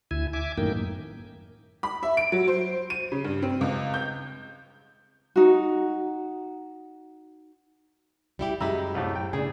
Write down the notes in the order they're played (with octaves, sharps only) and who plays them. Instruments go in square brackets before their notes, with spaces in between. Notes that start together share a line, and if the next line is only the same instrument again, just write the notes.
[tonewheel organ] D2 E4 G#5
E5 G#5 D6
F#2 A2 D#3 A#3 G5
[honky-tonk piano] B5
E5
D7
F#3
C5
D#7
C#3
G2
C4
C#2
G6
[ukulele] D#4 F#4
[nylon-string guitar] G3 E4 G4
[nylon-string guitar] F#2 G#3 G4 [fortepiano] E5 A#5 B5
[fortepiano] C2 A2
G5
[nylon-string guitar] A2 C#3 [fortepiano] D4 G#4